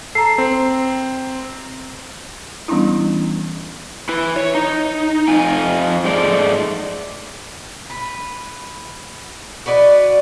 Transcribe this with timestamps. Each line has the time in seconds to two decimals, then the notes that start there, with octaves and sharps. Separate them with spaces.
0.15 A4 A#5 C7
0.38 C4
2.68 E3 G3 B3 C#4 D4 E4
4.09 E4 B4
4.36 C#5
4.55 D#4
5.28 F2 F4 G#5
6.04 G#2 G#3 A3 D5
7.90 B4
9.66 F#4 B4 D5 D#5